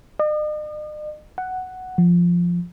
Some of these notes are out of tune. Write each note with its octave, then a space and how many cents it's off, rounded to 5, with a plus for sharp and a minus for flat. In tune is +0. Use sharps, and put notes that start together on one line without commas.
D#5 -45
F#5 +5
F3 +0